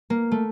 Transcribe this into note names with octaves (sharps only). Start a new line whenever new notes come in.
A#3
A3